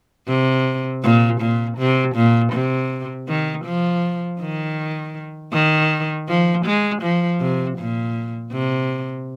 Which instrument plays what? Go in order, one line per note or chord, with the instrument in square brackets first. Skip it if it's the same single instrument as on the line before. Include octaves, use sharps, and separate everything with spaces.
[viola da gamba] C3
A#2
A#2
C3
A#2
C3
D#3
F3
D#3
D#3
F3
G#3
F3
C3
A#2
C3